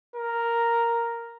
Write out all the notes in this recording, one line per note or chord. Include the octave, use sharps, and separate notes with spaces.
A#4